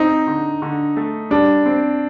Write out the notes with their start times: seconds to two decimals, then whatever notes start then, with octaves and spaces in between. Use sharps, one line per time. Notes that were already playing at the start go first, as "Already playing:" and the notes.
Already playing: C4 D#4
0.27 D3
0.62 D3
0.96 A3
1.31 G3 D4
1.65 C4